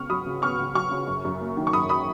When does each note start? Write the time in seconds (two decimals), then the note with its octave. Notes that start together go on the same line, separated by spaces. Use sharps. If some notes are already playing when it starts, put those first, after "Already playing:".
Already playing: C#2 B3 C#6 F6
0.10 F#3 B5 D#6
0.26 C#3
0.42 B3 C#6 F6
0.59 C#2
0.75 F#3 C#6 F6
0.91 C#3
1.07 F#2
1.24 F#2
1.41 A#3
1.57 D#3
1.67 C#6
1.73 F#2 B5 D#6
1.89 B5 D#6